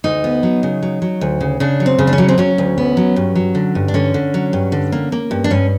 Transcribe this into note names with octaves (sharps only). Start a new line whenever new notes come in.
D2 D#4
B3
F#3
C#3
F#3
F#3
D2
C#3
C#3 D4
F#3
C4
C#3
D4
C#4
F#3
C4
F#3 C#4
D2
B3
F#3
G2
F#3
D3
G2
D4
D3 C#4
D3
F#3
G2
D3
A#3
A#3
G2
D4
G2 C#4